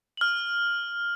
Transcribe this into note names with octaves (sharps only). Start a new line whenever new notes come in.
F6 F#7